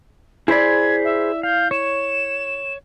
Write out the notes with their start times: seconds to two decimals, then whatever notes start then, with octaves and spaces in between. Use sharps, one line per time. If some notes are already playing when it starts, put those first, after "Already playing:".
0.48 E4 G#4 C5 D5 B5 G#6
1.04 E5
1.43 F5 G6
1.71 C#5 E7